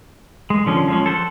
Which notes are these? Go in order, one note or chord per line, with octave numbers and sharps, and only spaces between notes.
G#3
D3 F3 C#4
F3 G#3 C#4
A4 C5 C#5 F#5